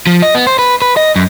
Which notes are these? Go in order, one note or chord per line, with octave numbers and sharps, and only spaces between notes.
F3
D#5
B3
C5
B4
B4
D#5
F#2